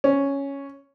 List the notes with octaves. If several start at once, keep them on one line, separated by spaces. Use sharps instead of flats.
C#4